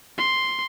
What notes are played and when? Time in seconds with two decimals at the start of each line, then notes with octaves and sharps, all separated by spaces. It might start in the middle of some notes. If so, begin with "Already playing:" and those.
0.18 C6